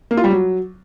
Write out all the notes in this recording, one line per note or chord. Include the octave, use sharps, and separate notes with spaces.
A#3
F4
G3
F#3